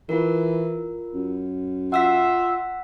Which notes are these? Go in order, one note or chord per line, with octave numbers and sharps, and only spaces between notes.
E3 F4 A#4
F#2
F4 E5 F#5 E6 B6